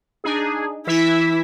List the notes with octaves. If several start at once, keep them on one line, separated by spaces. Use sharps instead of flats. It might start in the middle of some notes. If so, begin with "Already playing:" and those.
D4 D#4 G#4
E3 E4 E5 B6